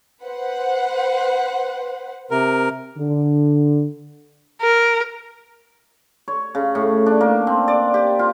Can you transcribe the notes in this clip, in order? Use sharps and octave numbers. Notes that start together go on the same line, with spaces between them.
B4 C5 F#5
C3 A#4
D3
A#4
C#5
C#3
A2
D4
A#3
C4
D5
G4
F4